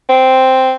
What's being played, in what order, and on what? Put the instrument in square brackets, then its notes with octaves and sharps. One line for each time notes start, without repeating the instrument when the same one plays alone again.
[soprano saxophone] C4